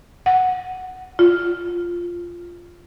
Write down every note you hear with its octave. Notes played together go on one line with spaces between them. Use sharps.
F#5
F4